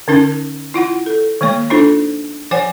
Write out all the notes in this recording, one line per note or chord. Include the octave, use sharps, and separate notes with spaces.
D3 C#4 D#4 A#4
E4 F4 F#5
A4
D#3 G#3 A#3 C#5
D4 D#4 F4 A4 C5
F3 C5 C#5 F#5 G#5